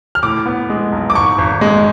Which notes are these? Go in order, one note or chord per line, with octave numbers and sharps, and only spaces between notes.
F6
A2 D6
B3
G#3
B1
D6
G#2 C#6
G#1
G#3